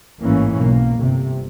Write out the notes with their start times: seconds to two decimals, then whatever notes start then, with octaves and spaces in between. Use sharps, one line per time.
0.23 A1 G#2 E3 A#3 C#4
0.54 B1 A#3
0.98 G1 C3